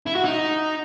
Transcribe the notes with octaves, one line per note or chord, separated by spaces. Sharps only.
E4
F#4
D#4